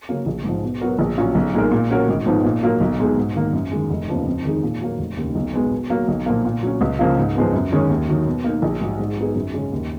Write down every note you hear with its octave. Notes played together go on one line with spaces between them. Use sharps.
C#3 F#3 A#3 C#4
A#1
G#2 F3
B2
F#3 B3 F#4 A#4
A#1
A#2 F#3 C#4 F4
B1
A#2 G#3 D#4 A#4
A#2
F#3 C#4 F#4 A#4
G#1
G#2 F3 B3 D#4
A#2
F#3 A#3 F4 A#4
B1
B2 G#3 D#4 G#4
G#2
D#3 A#3
F#2
D#3 G#3
F1
D#2 C#3 F3 B3
F2
D#3 G#3 D#4 G#4
A#2
F#3 A#3
F1
D#2 C#3
B1
B2 G#3 B3
B2
F#3 A#3
B1
A#2 F3 A#3
A#2
F#3 C#4
C#2
C#3 F3 A#3 F4
G#2
F3 G#3 B3
F#2
D#3 G#3 C#4
D#2
D#3 F#3
B2
A#3 D#4
A#1
G#2 F#3
G#2
F#3 B3 D#4 G#4
F#2
C#3 G#3 C#4
D#2